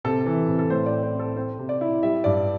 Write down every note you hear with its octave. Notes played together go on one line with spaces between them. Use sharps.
C3 A4
E3
C3
A4
A2 C5
D5
C4
C5
C4 A4
C4 C5
C3
D5
E4
G3 E5
G2 D5